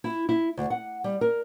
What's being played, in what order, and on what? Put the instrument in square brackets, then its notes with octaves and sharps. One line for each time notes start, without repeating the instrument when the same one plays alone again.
[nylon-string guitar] E4
E4
D2
F#5
G3
A#4